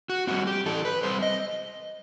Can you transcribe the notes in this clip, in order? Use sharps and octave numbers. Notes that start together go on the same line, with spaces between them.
F#4
G3 C4 F#4
G4
E3 A4
B4
G3 C4 C5
D#5